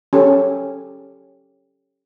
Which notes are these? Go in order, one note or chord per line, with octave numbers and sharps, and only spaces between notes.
C#4 G4 A4